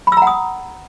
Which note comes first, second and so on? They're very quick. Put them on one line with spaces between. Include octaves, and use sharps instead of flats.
B5 E6 A#5 F#5 D#6